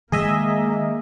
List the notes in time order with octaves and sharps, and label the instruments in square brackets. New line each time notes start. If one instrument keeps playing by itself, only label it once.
[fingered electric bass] D#3 G#3 [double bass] A#3 [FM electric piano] G#4 D#5 E5